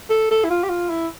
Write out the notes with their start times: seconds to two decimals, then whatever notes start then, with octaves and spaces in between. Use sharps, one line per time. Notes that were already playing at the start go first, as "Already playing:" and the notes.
0.10 A4
0.31 A4
0.44 E4
0.50 F4
0.63 G4
0.69 F4
0.90 E4